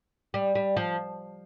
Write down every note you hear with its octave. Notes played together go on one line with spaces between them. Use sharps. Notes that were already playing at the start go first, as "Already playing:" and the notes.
G3
G3
F3